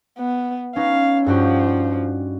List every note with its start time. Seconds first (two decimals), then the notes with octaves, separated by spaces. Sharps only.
0.17 B3
0.76 C#4 D#4 B4 F5
1.26 G2 F3 F#4 G4